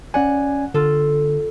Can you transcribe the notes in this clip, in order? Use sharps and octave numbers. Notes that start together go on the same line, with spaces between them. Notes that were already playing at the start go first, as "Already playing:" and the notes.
C#4 D5 F#5 G#5
D3 F4 A4